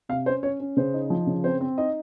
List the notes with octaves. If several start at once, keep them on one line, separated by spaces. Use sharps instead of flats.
C3 F5
C#4 C5
C#4 C#5
C#4
C#3 C5
D#4
F3
C#3
C4 C5
C4
D#4 D#5